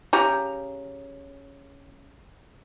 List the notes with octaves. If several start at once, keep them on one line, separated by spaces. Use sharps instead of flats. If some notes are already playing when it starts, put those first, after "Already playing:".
C#3 G4 A#5